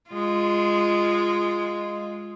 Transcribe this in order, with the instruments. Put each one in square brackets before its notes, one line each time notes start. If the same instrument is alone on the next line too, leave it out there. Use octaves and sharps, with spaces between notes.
[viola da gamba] G#3 F4